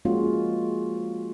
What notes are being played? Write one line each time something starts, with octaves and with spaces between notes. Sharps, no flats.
F3 G#3 A#3 C#4 F4 F#4